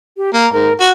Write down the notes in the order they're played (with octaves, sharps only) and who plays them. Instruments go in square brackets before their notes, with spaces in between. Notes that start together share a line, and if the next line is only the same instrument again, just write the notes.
[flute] G4
[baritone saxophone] A#3 [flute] A#5
[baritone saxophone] G#2 [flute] A#4
[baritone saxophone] F#4 [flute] F#6